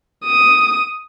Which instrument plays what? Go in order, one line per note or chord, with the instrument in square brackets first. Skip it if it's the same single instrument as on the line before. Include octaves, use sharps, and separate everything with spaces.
[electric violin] D#6